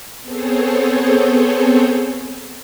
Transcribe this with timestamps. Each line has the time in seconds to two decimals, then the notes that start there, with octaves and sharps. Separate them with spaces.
0.23 B3 C4 G#4 A4 C5 C#5